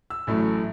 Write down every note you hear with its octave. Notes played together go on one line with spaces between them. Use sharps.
E6
A1 A2 F#3 A3